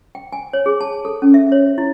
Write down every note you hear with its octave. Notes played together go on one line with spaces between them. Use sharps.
G5
G#5
C#5
G#4
A5
A4
C#4
E5
C#5
E4